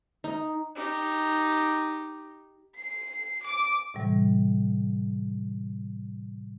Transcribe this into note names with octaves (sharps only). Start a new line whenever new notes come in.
D#4
D#4 G4
C7
D6
A2 C3 E3 G3